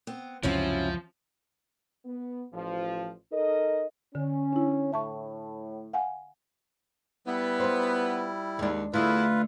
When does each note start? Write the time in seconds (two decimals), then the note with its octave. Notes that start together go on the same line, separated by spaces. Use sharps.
0.07 B3 C4
0.43 C#2 F#2 C3 F3 C#4 E4 F#4
2.05 B3
2.52 A1 F3
3.32 D#4 A4 A#4 D#5
4.15 D3 C#4
4.53 D4 E4
4.93 A2 E5 A5 C#6
5.93 F5 F#5 G#5
7.27 G3 B3 E4
7.60 F4 C5
8.59 D#2 G#3 D4
8.94 E2 D3 A3 E4 F4 B4